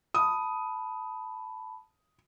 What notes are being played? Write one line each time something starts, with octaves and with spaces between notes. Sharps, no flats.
A5 B5 D#6